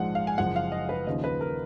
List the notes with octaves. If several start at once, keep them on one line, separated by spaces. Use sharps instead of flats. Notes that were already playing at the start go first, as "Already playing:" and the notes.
Already playing: A#1 G#2 F3 G#3 F#5
F5
G#5
F#1 F#2 F3 G#3 F#5
F5
D#5
B4
D#2 C#3 F3 D#5
B4
A#4